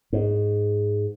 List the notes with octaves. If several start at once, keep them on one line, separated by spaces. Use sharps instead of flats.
G#2